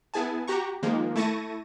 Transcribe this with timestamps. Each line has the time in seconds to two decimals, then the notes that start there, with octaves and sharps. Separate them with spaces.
0.14 B3 E4 G#4 G#5 A5
0.48 F#4 G4 A#5 C#6
0.83 D#3 F3 G#3 A#3
1.16 A3 E4 A5 C#6 A#6 D#7